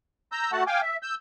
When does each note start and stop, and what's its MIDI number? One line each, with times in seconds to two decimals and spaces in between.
0.32 0.51 82
0.32 0.51 88
0.32 0.51 91
0.52 0.64 57
0.52 0.64 66
0.52 0.64 78
0.52 0.64 81
0.67 0.81 77
0.67 0.81 79
0.67 0.81 80
0.67 0.81 86
0.82 0.97 76
1.03 1.15 88
1.03 1.15 91